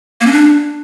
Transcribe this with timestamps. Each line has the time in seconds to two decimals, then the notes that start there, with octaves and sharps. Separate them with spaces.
0.21 A#3
0.27 C#4
0.32 D4